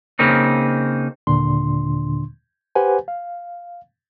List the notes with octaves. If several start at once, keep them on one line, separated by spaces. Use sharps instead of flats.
C#3 A#3 C4 D#4
D#2 A#2 D3 D4 C6
G4 B4 C5 F#5 G#5
F5